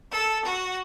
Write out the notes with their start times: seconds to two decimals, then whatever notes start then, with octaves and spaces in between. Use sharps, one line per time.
0.12 A4
0.45 F#4